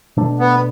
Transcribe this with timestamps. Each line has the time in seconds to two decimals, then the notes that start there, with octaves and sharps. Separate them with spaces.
0.17 B2 A3 D4
0.40 B3